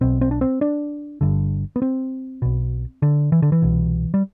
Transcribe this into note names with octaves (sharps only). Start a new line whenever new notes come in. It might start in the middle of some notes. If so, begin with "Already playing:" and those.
B1 B2 C4
C4
D4
C4
D4
G1 G2 D3
B3
C4
B1 B2
D3
E3
D3
E3
C2 B2
G3